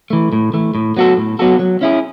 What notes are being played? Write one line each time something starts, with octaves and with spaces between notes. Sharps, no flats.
E3 A3
A2
E3 A3
A2
F#3 B3 F#4 A4
A2
F#3 B3 F#4 A4
F#3
C#4 E4 G#4